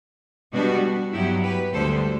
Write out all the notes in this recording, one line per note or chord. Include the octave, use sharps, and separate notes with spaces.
B2 G3 B3 D4 F#4
G2 F#3 B3 E4 G4
G4 B4
D2 D3 G3 A4 C5